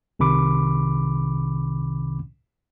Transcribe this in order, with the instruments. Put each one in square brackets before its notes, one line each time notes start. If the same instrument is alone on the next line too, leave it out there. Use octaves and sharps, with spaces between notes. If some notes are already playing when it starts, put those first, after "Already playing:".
[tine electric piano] C2 C3 D#3 B5 D6